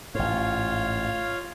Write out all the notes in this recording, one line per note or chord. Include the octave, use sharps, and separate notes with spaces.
A1 G#2 F4 C#5 F5